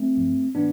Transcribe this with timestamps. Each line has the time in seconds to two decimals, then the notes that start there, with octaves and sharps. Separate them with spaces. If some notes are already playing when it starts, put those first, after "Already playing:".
Already playing: A3 C4
0.16 G2 F3
0.55 A2 E3 B3 D4